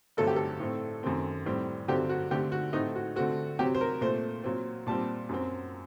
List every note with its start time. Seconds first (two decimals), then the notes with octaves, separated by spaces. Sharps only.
0.17 G2 D3 F#3 A3 C4 A4
0.27 G4
0.36 A4
0.60 A2 A3 C4
1.03 F#2 D#3 A3 C4
1.46 A2 G3 C4
1.88 G2 D3 F#3 C4 G4
2.09 F#4
2.31 D3 A3 C4 G4
2.52 F#4
2.73 A2 A3 C4 D#4
2.95 F#4
3.16 D3 A3 C4 F#4
3.59 C3 F#3 C4 G4
3.75 C5
3.81 A#4
4.01 A#2 A3 C4 C5
4.44 A#2 F#3 C4
4.87 A#2 G3 C4 A5
5.29 F#2 F#3 C4